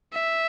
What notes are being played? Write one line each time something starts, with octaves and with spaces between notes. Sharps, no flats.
E5